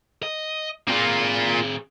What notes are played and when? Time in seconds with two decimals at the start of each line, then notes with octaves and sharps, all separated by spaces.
0.23 D#5
0.87 A#3 C4 F4 G#4